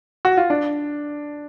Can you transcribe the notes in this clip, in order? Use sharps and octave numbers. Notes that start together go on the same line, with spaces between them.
F#4
F4
D4